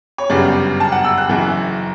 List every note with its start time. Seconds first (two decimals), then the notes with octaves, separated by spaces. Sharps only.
0.18 C#5
0.30 G1 F#2 C#3 G3 B3 D5
0.80 A5
0.92 F#5
1.04 E6
1.18 F#6
1.29 F#1 F#2 E3